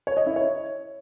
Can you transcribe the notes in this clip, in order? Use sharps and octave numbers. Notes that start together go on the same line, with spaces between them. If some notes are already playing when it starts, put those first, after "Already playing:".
C#5
D#5
E4
C#5